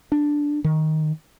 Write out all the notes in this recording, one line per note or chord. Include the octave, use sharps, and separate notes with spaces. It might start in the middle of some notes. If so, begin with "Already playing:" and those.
D4
D#3